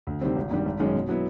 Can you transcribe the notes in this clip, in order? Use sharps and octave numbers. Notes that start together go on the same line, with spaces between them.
D2
C3 D#3 G3 C4
G#1
G2 D#3 G3
G#1
F#2 D#3 G#3 C#4
B2
F#3 B3 E4